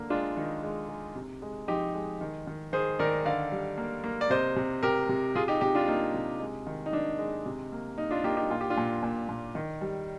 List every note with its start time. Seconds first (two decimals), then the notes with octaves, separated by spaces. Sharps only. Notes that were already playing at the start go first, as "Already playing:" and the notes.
Already playing: D3 A#3
0.10 G#3 D4 F4
0.36 D#3 D#4
0.63 G#3
0.89 G#3
1.15 C3
1.42 G#3
1.68 F3 D#4 G4
1.94 G#3
2.21 D#3
2.47 D#3
2.73 D#3 G#4 C5
2.99 D#3 A#4 D5
3.25 D3 D5 F5
3.52 G3
3.78 A#3
4.04 A#3
4.21 D5
4.30 C3 C5 D#5
4.56 C3
4.83 C3 G4 A#4
5.09 C3
5.35 C3 F4 G#4
5.48 D#4 G4
5.61 C3 D#4 G4
5.75 D4 F4
5.88 A#3 D#4
6.14 C3
6.40 G#3
6.67 D#3
6.86 D#4
6.93 D#3 D4
7.19 G#3
7.46 C3
7.72 A#3
7.98 A#3 D#4
8.11 D4 F4
8.24 A#3 D#4 G4
8.37 D#4 G4
8.51 A#2 F4
8.61 G4
8.70 D4 F4
8.77 A#2
9.03 A#2
9.29 A#2
9.55 D#3
9.81 G3